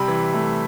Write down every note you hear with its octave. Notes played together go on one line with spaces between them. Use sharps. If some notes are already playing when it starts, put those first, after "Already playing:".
Already playing: C3 G3 B5
E3
A3